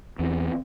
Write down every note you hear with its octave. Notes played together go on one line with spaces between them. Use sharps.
E2 C4